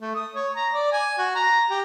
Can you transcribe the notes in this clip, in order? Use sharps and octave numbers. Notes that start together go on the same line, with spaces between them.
A3
D#6
C#5
A#5
D5
G#5
F#4
A#5
G4